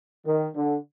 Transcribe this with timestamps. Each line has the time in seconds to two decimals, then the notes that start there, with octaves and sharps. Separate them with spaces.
0.26 D#3
0.54 D3